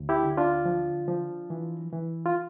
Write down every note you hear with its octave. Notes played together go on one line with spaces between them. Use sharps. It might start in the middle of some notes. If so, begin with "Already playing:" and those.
Already playing: D2
E4 G4
D3
D4 F4
F3
F3
E3
E3
F4